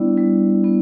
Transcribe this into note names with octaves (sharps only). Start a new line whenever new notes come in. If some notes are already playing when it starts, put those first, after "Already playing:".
Already playing: G3 B3 D4 E4 D5
G3
B3 E4